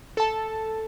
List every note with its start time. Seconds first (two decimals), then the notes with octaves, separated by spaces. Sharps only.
0.17 A4 A5